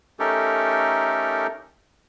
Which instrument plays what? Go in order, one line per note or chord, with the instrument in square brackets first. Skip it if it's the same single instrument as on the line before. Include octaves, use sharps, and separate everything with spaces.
[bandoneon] A3 C#4 D#4 G4 A4 A#4